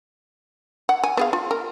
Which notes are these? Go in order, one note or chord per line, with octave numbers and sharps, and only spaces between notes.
F#5
G#5
B3 G#4 F5
F4
A#4